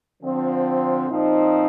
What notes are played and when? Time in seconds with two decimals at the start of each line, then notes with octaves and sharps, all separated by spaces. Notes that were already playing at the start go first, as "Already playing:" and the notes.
0.23 D3 F3 C4
1.08 A#2 F3 C4 D#4